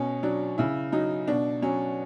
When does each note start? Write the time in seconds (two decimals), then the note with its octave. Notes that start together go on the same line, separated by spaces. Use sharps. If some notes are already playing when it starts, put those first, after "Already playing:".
Already playing: B2 C#4
0.23 F#3 D4
0.58 C#3 E4
0.92 F#3 D#4
1.28 B2 D4
1.62 F#3 C#4